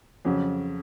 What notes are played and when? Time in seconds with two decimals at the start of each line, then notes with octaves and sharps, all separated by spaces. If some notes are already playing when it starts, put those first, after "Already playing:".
0.25 F2 C#3 F#3 C#4